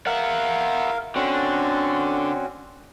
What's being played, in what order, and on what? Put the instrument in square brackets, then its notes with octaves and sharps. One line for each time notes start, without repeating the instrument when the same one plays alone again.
[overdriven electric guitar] E4 F#5 [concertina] A#4 F5
[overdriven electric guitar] D3 [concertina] C4 C#4 F#4